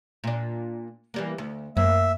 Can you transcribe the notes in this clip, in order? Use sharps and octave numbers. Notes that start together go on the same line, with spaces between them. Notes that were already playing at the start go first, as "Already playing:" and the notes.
A#2 D4
E3 G3 A#3
D2
F#2 A#3 E5